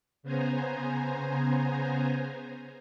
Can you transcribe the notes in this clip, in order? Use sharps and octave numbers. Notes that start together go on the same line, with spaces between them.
C#3 B3 C5 G#5 A#5